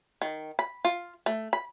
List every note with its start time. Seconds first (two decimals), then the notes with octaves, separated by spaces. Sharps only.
0.22 D#3
0.59 B5
0.85 F4
1.26 A3
1.53 B5